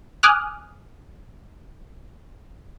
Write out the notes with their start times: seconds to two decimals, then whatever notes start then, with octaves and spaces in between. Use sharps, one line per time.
0.23 G#5 D6 D#6 F6 F#6